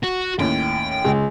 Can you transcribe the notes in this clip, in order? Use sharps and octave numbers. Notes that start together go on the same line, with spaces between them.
F#4
D#2 A2 C#4 G5
C#2